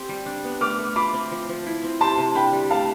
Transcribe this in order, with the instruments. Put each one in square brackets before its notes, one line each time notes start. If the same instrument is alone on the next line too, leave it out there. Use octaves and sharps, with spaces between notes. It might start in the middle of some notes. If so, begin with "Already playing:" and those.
Already playing: [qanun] C4 G4
G3
D4
B3
[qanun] A3 [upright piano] D6 F6
[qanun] A3
[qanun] F4 [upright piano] B5 D6
[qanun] C4
F3
F3
E4
C4
[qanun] G4 [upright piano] A5 C6
[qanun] C3
[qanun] D4 [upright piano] G5 B5
[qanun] G3
[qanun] A3 [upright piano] F5 A5